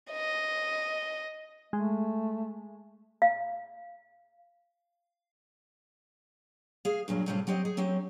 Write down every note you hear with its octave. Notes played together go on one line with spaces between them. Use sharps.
D#5
G#3 A3
F5
G#4 F5
G2 A#2 F#3
A2 C3 G3 C4 C#4 F4
F#3 C4 G4 C#5 D#5
G#4
F#3 C4 C#4 G4